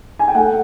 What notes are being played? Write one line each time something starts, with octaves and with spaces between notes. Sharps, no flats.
G#5
G5
A3 F#5